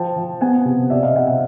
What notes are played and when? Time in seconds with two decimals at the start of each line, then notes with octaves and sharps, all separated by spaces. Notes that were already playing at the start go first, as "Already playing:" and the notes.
Already playing: F3 G5 A5
0.16 F3
0.41 B3 F#5 G#5
0.65 C3
0.90 C3 D5 E5
1.03 D#5 F5
1.15 C3 E5 F#5
1.27 E5 F#5